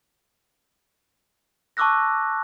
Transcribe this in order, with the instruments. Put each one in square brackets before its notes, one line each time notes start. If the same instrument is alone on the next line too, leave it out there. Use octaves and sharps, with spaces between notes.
[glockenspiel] A5 C#6 D6 E6 F#6 A#6